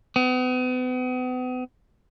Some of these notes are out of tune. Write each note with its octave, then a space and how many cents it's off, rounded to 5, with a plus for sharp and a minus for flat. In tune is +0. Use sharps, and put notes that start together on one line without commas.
B3 +40